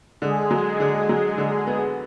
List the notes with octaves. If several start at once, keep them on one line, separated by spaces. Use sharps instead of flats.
D3 G#3 G#4
F#3
D3
F#3
D3
B3